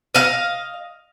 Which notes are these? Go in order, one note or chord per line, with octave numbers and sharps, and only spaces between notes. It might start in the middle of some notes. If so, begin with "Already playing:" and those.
D#5 F5